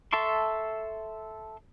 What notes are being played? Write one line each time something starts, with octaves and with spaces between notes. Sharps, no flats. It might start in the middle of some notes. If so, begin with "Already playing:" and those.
A4 E5 A5 C6 C#6